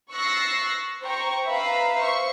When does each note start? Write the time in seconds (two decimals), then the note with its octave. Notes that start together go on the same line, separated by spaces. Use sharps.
0.12 C#6 E6 F#6 A6 A#6 C7
1.02 C5 G5 A#5 C#6
1.47 B4 E5 F5 A#5 B5
1.98 C5 E5 C#6